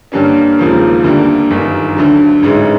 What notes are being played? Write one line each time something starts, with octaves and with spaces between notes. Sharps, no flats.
G2 D3 G3 A#3 C#4
E1 D#2 C#3 F3 A#3
D2 D3 G3 A#3
G1 F#2 D#3
D2 D3 F#3
A1 G#2 E3 G#3 C#4